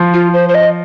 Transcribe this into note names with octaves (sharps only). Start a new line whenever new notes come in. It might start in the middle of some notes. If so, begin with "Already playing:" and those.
Already playing: F3
F4
C5
C5
D#5